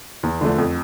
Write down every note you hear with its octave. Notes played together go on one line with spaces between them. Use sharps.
E2
D3 F3 A3 D4
F2